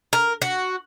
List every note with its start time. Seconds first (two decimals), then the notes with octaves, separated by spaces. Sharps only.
0.13 A#4
0.42 F#4